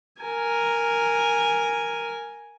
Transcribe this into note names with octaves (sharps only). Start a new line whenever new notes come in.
A#4 G#5